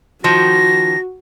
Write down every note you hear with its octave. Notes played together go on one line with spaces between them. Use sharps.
D#3 F3 F#4 A#6